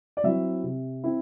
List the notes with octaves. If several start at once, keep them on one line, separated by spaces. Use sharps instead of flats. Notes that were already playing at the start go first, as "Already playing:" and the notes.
D5
F#3 C4 E4 E5
C3
C4 E4